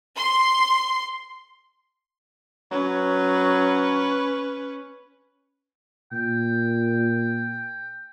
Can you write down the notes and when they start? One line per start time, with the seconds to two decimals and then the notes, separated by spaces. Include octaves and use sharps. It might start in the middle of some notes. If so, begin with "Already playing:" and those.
0.16 C6
2.72 F#3 C#4 B4
6.12 A#2 G5